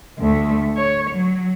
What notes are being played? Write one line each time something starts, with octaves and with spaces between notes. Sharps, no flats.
D2 A3
C#5
F#3